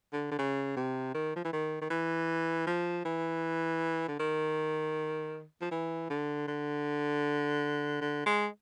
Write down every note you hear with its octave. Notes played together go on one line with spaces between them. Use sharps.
D3
D3
C#3
C3
D#3
F3
E3
D#3
D#3
E3
F3
E3
D3
D#3
F3
E3
D3
D3
D3
G#3